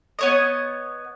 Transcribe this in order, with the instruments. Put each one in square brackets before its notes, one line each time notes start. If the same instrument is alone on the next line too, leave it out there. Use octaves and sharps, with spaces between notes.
[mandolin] B3 C#5 D#5